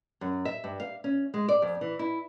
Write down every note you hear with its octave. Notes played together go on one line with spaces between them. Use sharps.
F#2
E5
G2
F5
C#4
G#3
D5
F2
E3
E4